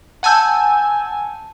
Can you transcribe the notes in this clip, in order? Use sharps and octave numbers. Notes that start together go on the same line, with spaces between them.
F#5 G#5 A5 E6 G6